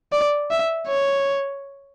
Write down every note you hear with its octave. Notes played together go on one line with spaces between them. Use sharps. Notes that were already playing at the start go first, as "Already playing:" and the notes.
D5
E5
C#5